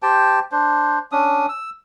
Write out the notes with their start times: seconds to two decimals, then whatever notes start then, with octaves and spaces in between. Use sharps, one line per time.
0.02 G4 C5 G5 A5
0.52 D4 C5
1.12 C#4 D4 D#6
1.49 E6